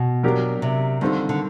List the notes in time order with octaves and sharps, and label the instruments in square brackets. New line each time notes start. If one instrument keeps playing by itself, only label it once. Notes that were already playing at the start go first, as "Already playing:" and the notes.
Already playing: [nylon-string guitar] B2
[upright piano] F#3 A#3 D4 G4 A#4
[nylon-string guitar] C3
[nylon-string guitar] D3 [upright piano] D#3 G3 C4 F4 A4
[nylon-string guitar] D3